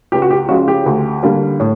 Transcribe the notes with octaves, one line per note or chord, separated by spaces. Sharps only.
C#2 G4
F#4
G4
C#3 F3 G#3 F#4
G4
D2
D3 G3 A#3
A2